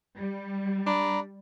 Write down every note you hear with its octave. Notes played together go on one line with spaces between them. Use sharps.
G3
D4 A#5 B5